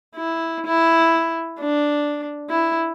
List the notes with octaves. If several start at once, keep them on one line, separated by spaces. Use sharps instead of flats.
E4
E4
D4
E4